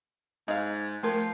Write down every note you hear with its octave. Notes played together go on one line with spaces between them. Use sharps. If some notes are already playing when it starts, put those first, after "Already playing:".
G#2 D#4 F5
F3 A3 A#4